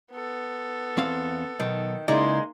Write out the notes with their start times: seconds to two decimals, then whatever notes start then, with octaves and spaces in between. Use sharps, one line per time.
0.13 B3 A4
0.97 E2 C4 F5
1.60 B1 D#3
2.08 C#2 G#3 A#3 D#4 E4 D5 C6